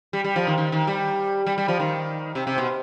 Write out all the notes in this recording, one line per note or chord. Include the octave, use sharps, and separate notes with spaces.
G3
G3
F3
D#3
D#3
D#3
G3
G3
G3
F3
D#3
C3
C3
B2